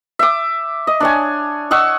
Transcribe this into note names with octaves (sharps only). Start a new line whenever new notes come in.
E5 D6
D#5
D4 C#5 G#5
D#5 F#5 C#6 E6